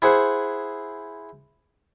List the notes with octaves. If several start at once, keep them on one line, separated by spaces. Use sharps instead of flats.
E4 G#4 C5 F#5